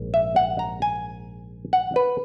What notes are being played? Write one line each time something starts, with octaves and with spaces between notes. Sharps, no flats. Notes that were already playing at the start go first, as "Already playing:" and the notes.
Already playing: A#1 G#2
E5
F#5
A#5
G#5
F#5
B4